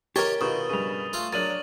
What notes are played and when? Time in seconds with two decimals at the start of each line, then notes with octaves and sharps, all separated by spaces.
0.16 G4 A#4 C#5 D#5 A#5 C#6 A6 G7
0.41 B2 D#3 D#4 F4 C#6 D#6
0.69 G2 C#3 D#7 F7
1.13 A3 F4 F5
1.33 F#3 D4 A#4 A6 D#7 F#7